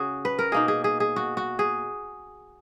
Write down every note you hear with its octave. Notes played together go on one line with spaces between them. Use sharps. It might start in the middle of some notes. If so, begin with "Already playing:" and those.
Already playing: C#3 F#4 G#4
B4
A#4
B2 A#3 D#4 G#4
G#4
G#4
G#4
F#4
F#4
G#4